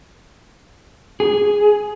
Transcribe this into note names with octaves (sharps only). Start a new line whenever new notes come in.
G#4